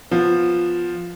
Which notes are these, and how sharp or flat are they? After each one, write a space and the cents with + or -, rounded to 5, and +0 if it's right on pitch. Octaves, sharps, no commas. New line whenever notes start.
F3 +0 B3 +0